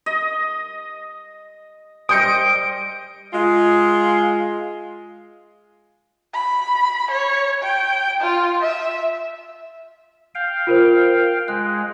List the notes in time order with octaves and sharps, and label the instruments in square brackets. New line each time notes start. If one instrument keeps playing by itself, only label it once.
[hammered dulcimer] D#5
[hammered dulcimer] G3 C5 D#5 [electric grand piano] D#6 G6 C#7 [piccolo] D7
[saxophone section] G#3 F4
[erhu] B5
C#5
G5
F4
E5
[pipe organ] F5 G5
[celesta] F4 A#4 C5
[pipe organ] G#3 [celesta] F#6